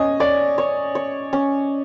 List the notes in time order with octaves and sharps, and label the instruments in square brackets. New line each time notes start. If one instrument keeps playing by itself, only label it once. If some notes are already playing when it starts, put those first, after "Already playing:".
Already playing: [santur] C#4 [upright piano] D#5
[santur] C#5 [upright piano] D5
[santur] C#5
C#5
C#4